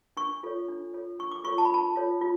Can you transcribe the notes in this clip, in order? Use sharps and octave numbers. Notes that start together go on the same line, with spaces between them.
D4 C#6
F4 A4 C#5
D4
F4 A4 C#5
D4 C#6
D6
F4 A4 C#5 C#6
A5
B5
D4 A5
F4 A4 C#5
F4